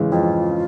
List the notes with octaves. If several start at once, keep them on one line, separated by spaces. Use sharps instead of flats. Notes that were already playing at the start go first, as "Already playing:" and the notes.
Already playing: C#3 E3 G#3
F2 F4